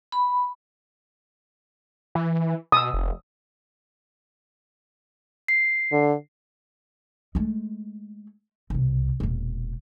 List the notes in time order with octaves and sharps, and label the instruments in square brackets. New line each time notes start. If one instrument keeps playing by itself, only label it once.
[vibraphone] B5
[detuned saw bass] E3
[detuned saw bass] B2 [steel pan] D#6 E6
[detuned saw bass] F1
[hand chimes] C7
[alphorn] D3
[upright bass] G#3 A3
C2 B2
E1 A#2